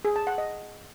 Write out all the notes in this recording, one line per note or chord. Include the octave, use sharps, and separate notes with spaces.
G#4
A5
F#5
D#5